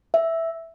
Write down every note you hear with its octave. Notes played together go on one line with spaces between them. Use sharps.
E5